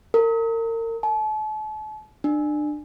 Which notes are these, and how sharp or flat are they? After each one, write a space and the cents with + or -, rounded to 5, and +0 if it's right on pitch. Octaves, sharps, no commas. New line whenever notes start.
A#4 -35
A5 -40
D4 +30